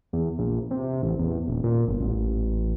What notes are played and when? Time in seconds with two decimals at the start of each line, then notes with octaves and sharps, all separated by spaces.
0.13 E2
0.38 A#1
0.71 C3
1.03 A1
1.19 E2
1.48 D#1
1.64 A#2
1.88 G1
2.00 A1